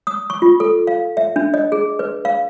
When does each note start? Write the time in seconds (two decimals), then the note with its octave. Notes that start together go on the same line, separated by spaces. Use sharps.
0.07 D#6
0.30 C#6
0.42 F4
0.60 A4
0.87 F5
1.17 E5
1.36 D4
1.54 D#5
1.72 G#4
1.99 B4
2.25 F5